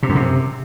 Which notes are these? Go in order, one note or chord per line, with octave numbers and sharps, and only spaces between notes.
C3
F#2
C3